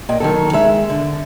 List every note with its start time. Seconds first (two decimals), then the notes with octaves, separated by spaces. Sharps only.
0.09 A#2 D#5 G5
0.20 D#3 F#3 A4
0.53 G#3 E5
0.90 D3